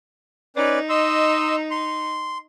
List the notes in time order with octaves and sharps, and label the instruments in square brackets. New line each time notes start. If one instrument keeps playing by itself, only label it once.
[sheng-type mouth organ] C#4 B4 D5 [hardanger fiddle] D#4
[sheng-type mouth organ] D#5 C6 E6
C6